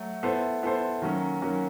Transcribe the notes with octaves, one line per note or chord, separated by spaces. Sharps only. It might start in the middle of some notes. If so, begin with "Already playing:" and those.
Already playing: F#3 A3
B3 E4 A4 C5
B3 E4 A4 C5
D#3 F#3 A#3 C#4
D#3 F#3 A#3 C#4